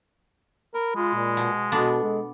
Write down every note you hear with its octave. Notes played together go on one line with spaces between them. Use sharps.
A#4 B5
G#3 F4
A#2
B2
B2 B3 D4 A4
G#3